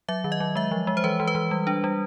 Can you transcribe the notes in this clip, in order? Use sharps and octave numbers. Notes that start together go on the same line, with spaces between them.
F#3 E5
D#3
D#5
F#3
G#3 E5
F3
G#3
C5
E3 B4
E3
B4
E3
G3
D4
G3